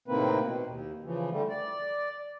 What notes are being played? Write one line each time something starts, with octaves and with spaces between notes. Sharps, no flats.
A2 C3 D#3 A#3 C4 B4
B2
D#2
C#3 E3 F3
D3 G3 A3
D5